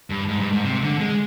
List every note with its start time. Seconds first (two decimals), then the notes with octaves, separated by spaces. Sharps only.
0.10 G2
0.29 G#2
0.40 G2
0.53 G#2
0.65 C3
0.83 D3
1.00 G#3